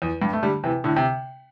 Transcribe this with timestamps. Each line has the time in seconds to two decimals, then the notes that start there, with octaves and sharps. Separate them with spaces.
0.02 E2
0.22 G2
0.33 A3
0.43 D3 G3
0.64 C3 E3
0.84 A2 D3
0.96 C3